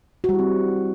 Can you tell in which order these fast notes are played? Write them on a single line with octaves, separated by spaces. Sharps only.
F#4 G3 E4 C4